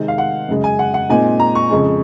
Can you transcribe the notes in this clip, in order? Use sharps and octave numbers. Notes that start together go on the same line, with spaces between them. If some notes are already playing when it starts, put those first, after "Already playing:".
Already playing: C3 D#3 G#3 C4
F5
F#5
F#2 C#3 G#3
G#5
F#5
F#5
A#2 G#3 C4 D#4 G#5
A#5
C#6
F2 C#3 G#3